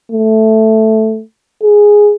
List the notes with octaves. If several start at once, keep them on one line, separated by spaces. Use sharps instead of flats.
A3
G#4